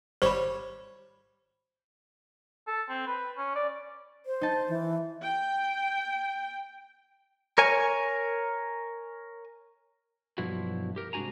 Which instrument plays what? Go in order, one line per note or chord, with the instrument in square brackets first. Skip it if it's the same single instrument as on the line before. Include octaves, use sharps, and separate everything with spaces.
[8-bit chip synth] G#1 G3 C#5 [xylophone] C5 B5
[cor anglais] A4
C4
B4
C#4
D5
[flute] C5
[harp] D#4 A5
[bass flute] E3
[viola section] G5
[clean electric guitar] A#4 C#5 G#5
B1 G2 F3 E4 F#4
G4 A#4
C2 G#2 D4 F#4 G#5 A#5